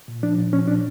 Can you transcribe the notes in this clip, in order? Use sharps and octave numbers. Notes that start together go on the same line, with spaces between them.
A#2
F3 D4
A#2
F3 C#4
A#2 D4